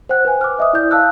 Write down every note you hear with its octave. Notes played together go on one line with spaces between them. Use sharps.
C5 F#5 G5 F#6
B4 C5 G#5
D6 F6
D#5 E5 D6 D#6
E4 D5 G6
F5 A5 E6 F#6